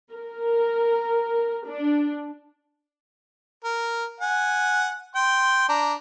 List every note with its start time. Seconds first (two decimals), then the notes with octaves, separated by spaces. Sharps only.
0.12 A#4
1.66 D4
3.65 A#4
4.21 F#5 G#5
5.15 G5 C6
5.69 D4 A#5